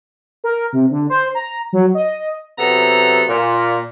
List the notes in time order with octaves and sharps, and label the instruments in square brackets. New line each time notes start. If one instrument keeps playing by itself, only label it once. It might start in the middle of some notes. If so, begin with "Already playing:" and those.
[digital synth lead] A#4
C3
D3
C5
A#5
F#3
D#5
[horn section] C3 F#3 B3 A4 A#5
A#2